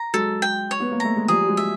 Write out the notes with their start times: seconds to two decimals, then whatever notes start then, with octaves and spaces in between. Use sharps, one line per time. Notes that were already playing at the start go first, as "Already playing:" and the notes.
Already playing: A#5
0.14 F#3 G#3 A4
0.42 G5
0.71 C#5
0.80 B3
0.91 A#3
1.00 A3 A#5
1.16 G#3
1.28 F3 G3 G#4
1.42 G3
1.47 F#3 G#3
1.57 E5